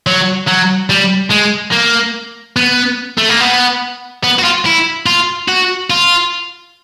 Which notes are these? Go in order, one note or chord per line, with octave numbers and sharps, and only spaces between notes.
F#3
F#3
G3
G#3
A#3
B3
A3
A#3
B3
B3
F#4
F4
E4
F4
F#4
F4